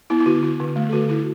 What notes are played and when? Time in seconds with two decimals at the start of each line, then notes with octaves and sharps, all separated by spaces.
0.10 B3 E4
0.20 E4
0.26 D3 F#4
0.43 E4
0.60 D3
0.76 A3
0.89 A4
0.92 D3 F#4
1.09 E4 F#4